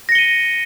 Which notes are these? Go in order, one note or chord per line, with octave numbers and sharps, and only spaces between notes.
A#6 C#7 D#7 G7